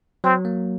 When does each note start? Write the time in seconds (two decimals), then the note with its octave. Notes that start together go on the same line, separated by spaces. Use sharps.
0.24 F#3 C4
0.45 A#3